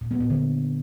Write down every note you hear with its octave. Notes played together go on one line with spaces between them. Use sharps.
A#2
B3
A#2
D3